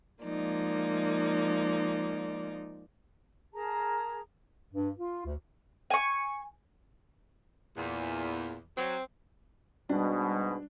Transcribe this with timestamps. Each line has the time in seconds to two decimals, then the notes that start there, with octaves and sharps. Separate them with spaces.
0.22 F3 G#3 A#3 D#4 D5
3.54 G#4 A#4 A5 A#5
4.73 G2
4.97 F4
5.25 D2
5.90 G#5 C#6
7.77 E2 A#2
8.77 F#3 C4
9.89 G#2 B2 G3 D4